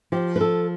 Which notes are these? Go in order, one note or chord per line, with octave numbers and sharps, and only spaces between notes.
F3 G4
B4
A4